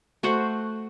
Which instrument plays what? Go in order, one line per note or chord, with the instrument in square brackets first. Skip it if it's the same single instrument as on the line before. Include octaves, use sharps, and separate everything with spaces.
[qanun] A3 F#4 C5 F#5